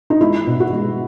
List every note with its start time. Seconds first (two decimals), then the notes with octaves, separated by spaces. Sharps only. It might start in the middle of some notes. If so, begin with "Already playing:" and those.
0.10 D#4
0.21 G#3 E4
0.47 B2
0.60 F#4
0.73 G#3